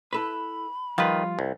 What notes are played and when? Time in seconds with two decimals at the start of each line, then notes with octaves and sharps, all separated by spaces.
0.13 E4 A4 B4 B5
0.98 D#3 F3 G3 F4 B4
1.39 C2